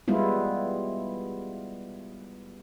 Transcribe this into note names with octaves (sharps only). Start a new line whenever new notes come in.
G3 G#3 B3 E4 F4